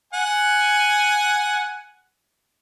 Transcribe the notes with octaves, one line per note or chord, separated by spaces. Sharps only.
F#5 G#5